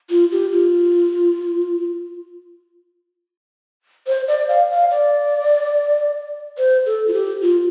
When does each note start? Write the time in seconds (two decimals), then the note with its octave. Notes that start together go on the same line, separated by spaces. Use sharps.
0.10 F4
0.32 G4
0.52 F4
4.07 C5
4.28 D5
4.49 F5
4.70 F5
4.91 D5
6.58 C5
6.86 A4
7.08 F4
7.13 G4
7.42 F4